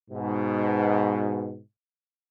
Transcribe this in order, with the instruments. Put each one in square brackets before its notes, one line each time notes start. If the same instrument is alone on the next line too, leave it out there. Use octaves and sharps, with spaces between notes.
[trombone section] G#2 B2